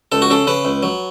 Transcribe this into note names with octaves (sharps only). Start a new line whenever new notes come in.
C#2 A4
F#4
C#3 A4
C#3 B4
C#2
F#3